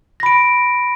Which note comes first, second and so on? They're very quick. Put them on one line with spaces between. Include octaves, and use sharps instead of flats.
A#6 B5 D7